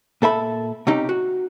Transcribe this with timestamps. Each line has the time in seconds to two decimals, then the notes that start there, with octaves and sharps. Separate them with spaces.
0.22 A#2 A4 E5 B5
0.87 C3 C#4 D#4 G4
1.09 F#4